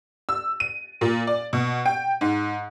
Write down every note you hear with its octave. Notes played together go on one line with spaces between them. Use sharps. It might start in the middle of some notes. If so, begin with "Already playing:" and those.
E6
D#7
A#2
D5
B2
G5
G#2